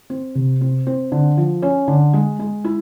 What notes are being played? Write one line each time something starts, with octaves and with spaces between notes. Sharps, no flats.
C4
C3
C4
C4
D3
F3
C#4
D3
G#3
G#3
E4